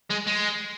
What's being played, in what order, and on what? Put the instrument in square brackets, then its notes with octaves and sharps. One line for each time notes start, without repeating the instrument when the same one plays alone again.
[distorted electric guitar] G#3
G#3